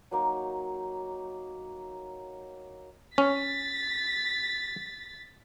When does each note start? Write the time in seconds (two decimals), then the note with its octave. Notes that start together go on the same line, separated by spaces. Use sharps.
0.11 F#3 A#3 D#4
3.18 C#4 A6 B6